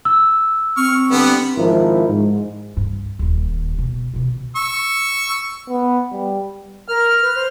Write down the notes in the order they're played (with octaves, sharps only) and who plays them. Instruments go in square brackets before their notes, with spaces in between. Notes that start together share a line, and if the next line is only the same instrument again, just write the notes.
[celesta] E6
[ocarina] C4 [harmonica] C#6 F6
[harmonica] D3 G3 B3
[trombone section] G#1 F3 E4 A#4
G#2
[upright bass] G2
D#1 D#2
B2
B2 D#3
[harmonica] C#6 E6
[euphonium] B3
G3
[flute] A#4 [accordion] F6
[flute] B4
C5